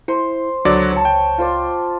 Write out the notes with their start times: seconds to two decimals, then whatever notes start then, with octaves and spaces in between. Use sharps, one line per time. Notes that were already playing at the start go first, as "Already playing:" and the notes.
0.08 E4 C5
0.65 C#2 D3 F#3 D5
0.93 C#5 A5
1.05 G5
1.38 F4 C5 D5